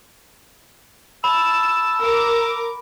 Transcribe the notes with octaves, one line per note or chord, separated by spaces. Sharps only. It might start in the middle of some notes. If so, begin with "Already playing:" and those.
A5 B5 E6
A#4 D6